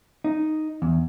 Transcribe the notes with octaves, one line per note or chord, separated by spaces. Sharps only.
D#4
E2